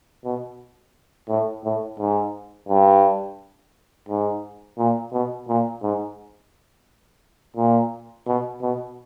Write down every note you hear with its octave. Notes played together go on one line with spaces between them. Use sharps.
B2
A2
A2
G#2
G2
G#2
A#2
B2
A#2
G#2
A#2
B2
B2